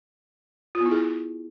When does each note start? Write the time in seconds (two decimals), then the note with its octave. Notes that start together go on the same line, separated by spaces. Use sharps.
0.75 F4
0.80 B3
0.86 E4
0.91 G#4